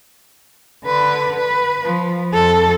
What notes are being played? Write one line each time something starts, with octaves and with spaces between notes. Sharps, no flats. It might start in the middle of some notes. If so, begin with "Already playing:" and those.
D3 B4
B4
F3
F2 A4